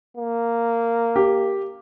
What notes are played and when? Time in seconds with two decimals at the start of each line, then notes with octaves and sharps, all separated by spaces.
0.17 A#3
1.16 G4